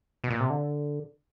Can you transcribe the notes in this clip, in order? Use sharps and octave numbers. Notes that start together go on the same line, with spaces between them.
B2
A#2
C3
D3